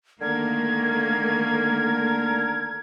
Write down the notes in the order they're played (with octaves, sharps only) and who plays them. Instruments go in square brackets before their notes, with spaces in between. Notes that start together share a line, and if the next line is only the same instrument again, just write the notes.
[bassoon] D3 [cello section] D#3 A3 A#3 [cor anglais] A#4 [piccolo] G#6